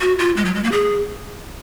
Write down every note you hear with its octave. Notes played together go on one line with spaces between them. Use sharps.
F#4
F4
G#3
F#3
G#3
A#3
G#4